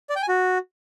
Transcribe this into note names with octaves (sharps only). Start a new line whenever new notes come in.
D5
G5
G#5
F#4